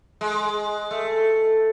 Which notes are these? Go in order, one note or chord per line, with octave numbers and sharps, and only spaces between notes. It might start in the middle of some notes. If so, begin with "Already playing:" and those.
G#3
A3